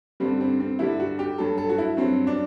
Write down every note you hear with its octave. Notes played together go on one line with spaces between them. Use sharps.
G2 D3 G3 C4
C4
C4
G2 D3 G3 E4
F#4
G4
G2 F#3 A4
A4
F#4
E4
G2 F#3 C4
D4